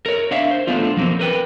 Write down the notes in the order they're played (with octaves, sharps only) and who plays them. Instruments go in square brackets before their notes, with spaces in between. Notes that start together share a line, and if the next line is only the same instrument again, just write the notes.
[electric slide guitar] A#4 C#5
D4 C#5 D5 E5 F5
C5
A3 B3 D4 F4
F3 F#3 A#3 C4 C#4
A#4 B4 G5